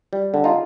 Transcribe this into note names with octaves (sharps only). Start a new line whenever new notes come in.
G3
D3
D#4 F4